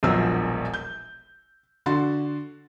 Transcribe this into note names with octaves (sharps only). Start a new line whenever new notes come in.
E1 A#1 B2 F3 F#3 E6
G6
D3 F#4 C6 A6